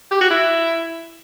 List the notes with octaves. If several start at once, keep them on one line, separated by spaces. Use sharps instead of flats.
G4
F#4
E4